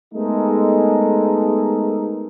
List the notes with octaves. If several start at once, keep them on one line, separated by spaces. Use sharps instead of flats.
G#3 A3 B3 D#4 A4 A#4